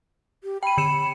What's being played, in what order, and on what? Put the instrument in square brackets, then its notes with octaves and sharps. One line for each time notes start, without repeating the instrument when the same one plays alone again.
[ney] G4
[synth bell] G5 D#7 [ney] B5
[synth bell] D3 C#7 E7